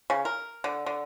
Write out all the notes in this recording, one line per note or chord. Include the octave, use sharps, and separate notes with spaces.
C#3
A#4
D3
D3